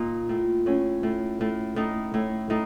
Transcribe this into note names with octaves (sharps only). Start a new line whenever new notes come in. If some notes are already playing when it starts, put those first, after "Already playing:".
Already playing: A#2 D#4 F4
A2
A2 C#4
A2
A2
A2 D#4
A2
A2 D#4